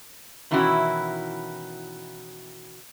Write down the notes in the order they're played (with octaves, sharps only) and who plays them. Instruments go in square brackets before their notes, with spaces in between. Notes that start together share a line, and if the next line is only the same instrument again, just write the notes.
[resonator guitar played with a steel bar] B2 D#3 E3 C#4 E4 F#4